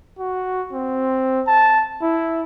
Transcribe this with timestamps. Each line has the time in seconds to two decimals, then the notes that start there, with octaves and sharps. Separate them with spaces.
0.19 F#4
0.73 C4
1.47 A5
2.02 E4